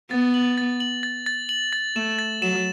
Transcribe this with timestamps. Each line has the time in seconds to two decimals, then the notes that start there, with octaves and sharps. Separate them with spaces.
0.11 B3 A6
0.34 F#7
0.58 A6
0.80 F#7
1.03 A6
1.26 A6
1.49 F#7
1.73 A6
1.96 A3 E7
2.19 A6
2.42 F#3 E7